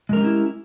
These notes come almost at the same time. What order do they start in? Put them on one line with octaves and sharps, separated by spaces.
G#3 A#4 C#4 G4 E4